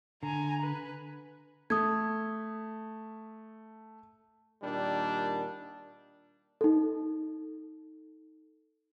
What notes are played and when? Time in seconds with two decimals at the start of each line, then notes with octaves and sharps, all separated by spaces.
0.23 D3 G#5 A#5
0.62 B4
1.70 A3 D#6 G#6
4.62 A#2 D#3 G3 D4
6.61 D#4 A4